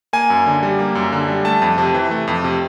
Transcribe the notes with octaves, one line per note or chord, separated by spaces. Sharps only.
A#3 G#5
F#2
D3
G3
A#3
F#2
D3
G3
A3 A5
F2
C3
E3
A3
F2
C3